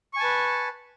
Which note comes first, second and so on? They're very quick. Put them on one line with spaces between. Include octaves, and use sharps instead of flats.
C#6 G#5 A5 B4